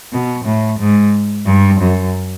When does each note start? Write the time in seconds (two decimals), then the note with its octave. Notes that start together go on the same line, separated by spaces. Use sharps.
0.12 B2
0.45 A2
0.80 G#2
1.46 G2
1.81 F#2